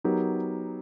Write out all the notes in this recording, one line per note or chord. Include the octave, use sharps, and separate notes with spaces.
F#3 B3 D#4 G4 A#4